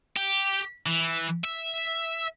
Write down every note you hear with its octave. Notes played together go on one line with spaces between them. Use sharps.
G4
E3
E5